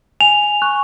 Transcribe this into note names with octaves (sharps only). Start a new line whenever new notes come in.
G#5 F7
C#6 F#6